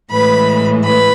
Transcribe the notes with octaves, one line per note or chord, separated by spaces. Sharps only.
A2 E3 G#3 B4 B5
B4 B5